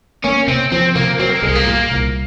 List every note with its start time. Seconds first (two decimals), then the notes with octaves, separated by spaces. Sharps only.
0.24 A#3 C#4
0.48 C3 C4
0.72 F3 C4
0.96 C3 A#3
1.19 F#3 C4
1.30 A#3
1.42 C2 G#3
1.55 A#3
1.66 A#2
1.90 C2